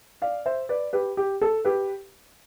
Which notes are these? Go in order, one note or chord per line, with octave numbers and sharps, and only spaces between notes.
D5 F5
C5 E5
B4 D5
G4 B4
G4
A4
G4 B4